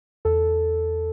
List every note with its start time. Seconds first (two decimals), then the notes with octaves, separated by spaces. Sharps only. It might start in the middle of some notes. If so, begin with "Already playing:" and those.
0.25 E2 A4